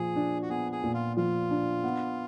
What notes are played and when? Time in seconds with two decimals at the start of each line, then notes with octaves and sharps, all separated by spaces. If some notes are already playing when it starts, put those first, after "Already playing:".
Already playing: A#2 F3 G#4
0.16 D4
0.42 F#4
0.50 B3 G#4
0.72 G#4
0.84 A#2
0.94 F4
1.17 F3 F4
1.51 D4
1.84 B3